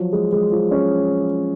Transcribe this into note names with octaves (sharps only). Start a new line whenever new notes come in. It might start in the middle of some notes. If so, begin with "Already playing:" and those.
Already playing: F3 F#3
G#3
G#3
F3
C#4